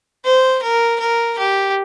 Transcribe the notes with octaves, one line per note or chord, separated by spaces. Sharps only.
C5
A#4
A#4
G4